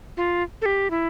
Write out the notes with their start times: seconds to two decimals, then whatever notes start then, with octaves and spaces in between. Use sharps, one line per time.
0.17 F4
0.62 A4
0.66 G4
0.91 E4